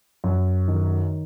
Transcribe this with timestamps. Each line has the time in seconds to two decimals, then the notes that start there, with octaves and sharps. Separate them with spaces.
0.24 F#2
0.68 D#3